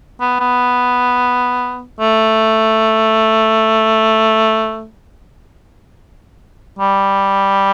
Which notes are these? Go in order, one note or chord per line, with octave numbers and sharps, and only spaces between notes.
B3
B3
A3
G3